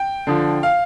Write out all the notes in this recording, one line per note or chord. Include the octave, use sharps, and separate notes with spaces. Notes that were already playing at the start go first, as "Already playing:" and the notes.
Already playing: G5
D3 F3
F5